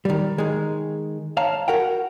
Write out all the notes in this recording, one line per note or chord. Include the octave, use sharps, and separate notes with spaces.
D#3 G3
D#3 G#3
C#5 F5 A5 A#5
F#4 A#4 F#5 G5